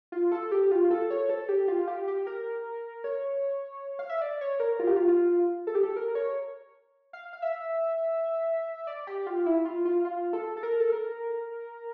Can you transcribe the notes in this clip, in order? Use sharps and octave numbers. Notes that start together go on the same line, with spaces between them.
F4
A4
G4
F4
A4
C#5
A4
G4
F4
G4
G4
A#4
C#5
F5
E5
D5
C#5
A#4
F4
G4
F4
F4
A4
G4
A4
A#4
C#5
F5
F5
E5
D5
G4
F4
E4
F4
F4
F4
A4
A4
A#4
A4
A#4